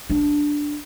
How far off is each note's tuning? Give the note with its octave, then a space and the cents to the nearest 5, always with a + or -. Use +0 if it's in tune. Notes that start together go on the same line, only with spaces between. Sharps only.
D4 +0